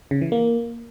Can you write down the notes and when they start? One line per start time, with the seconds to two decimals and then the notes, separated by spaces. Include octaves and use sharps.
0.11 C#3
0.21 E3
0.32 A#3